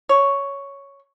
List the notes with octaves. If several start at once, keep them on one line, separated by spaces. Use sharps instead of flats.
C#5